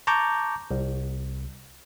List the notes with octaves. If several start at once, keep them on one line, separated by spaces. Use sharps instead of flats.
A5 A#5 C#6 D6 G6
C2